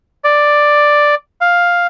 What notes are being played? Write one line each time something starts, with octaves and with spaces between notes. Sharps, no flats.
D5
F5